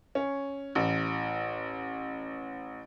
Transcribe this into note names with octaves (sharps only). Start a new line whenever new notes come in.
C#4
A1